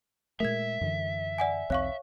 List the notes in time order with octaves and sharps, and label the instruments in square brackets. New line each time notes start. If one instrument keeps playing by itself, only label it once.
[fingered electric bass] A#2 G#3 A3 [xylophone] A#4 G#6 [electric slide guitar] E5
[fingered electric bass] F#2 D3 E3
[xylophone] D5 F#5 G#5
[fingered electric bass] B1 E2 C4 [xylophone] C#5 F5 C#6